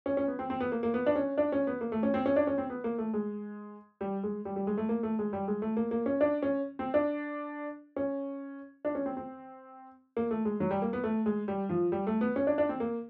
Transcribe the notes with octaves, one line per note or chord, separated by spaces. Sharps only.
C#4
C#4
B3
C4
C4
B3
A#3
A#3
B3
D4
C#4
D4
C#4
B3
A#3
A3
C#4
C4
C#4
D4
C#4
C4
B3
A#3
A3
G#3
G3
G#3
G3
G3
G#3
A3
A#3
A3
G#3
G3
G#3
A3
A#3
A#3
C#4
D4
C#4
C4
D4
C#4
D4
C#4
C4
C4
A#3
A3
G#3
F#3
G3
A#3
B3
A3
G#3
G3
F3
G3
A3
B3
C#4
D4
D4
C4
A#3